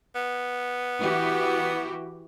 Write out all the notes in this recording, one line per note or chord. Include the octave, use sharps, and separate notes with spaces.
B3
E3 F#4 G4